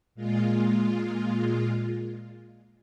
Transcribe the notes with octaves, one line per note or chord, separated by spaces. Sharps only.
A#2 G#3 F4